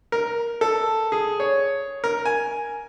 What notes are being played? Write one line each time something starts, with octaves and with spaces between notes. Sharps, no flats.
A#4
A4
G#4
C#5
A#4
G#5